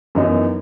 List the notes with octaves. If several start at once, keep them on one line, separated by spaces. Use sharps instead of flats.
F#2 E3 B3 D#4